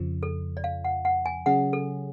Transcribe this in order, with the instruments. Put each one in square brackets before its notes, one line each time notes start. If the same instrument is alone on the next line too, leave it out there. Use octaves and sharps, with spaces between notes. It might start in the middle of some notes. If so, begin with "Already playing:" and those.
Already playing: [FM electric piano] F2 C#3 F3
[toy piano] A4
D5
F5
F#5
F#5
G#5
[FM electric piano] C#3 F#3 C#4 G#4 [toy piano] F#5
[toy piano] A4